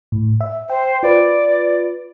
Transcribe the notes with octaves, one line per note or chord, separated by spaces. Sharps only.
A2
E5
C5 G5
F4 B4 D5